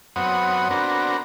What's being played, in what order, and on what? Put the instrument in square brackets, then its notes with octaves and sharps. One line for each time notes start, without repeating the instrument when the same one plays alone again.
[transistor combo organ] F#2 B3 C4 C#5 F#5 D#6
B3 C4 D4 F#4 A#4